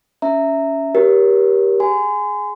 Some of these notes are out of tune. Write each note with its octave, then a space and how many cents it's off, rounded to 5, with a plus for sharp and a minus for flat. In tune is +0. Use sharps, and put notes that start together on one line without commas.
C#4 +20 E5 +0 A#5 -20
G4 +0 A#4 +20 C#5 +0
G#4 +0 G#5 +0 C6 -40